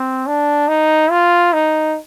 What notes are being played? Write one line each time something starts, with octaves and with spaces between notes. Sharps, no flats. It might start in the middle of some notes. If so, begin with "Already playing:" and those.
Already playing: C4
D4
D#4
F4
D#4